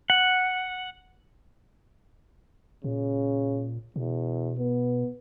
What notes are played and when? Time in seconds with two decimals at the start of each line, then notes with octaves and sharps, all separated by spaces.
0.10 F#5
2.84 A#2 C#3
3.96 E2 B2
4.58 B3